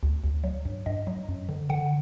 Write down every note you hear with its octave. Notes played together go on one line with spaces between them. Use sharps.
D2
D2
F#3
G2
G2 D#5
F#3
F#2
D3
D3 F#5